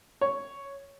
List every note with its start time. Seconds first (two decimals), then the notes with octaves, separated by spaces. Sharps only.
0.21 C#5